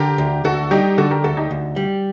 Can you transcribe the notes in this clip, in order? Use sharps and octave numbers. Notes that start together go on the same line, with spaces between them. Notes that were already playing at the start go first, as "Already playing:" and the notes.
Already playing: D3 G4 A#4
D2
D2 F#4 A4
G3 D#4 G4
D3 F#4 A4
G4 A#4
D2 F#4 A4
D#4 G4
D2
G3